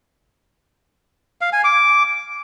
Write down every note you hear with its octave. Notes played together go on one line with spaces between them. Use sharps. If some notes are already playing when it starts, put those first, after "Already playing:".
F5
G#5
D6